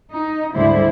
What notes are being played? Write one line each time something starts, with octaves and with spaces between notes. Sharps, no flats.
D#4
D2 G#2 D3 G3 E4 C5